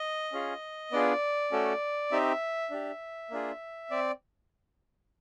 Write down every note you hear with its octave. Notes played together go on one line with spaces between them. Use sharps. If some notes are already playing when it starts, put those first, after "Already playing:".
Already playing: D#5
C#4 F4 G#4
B3 D4 F4 G#4 D5
A3 C#4 F#4 A4
C4 D#4 G4 E5
D4 G4
A#3 D4 F4 G#4
C4 D5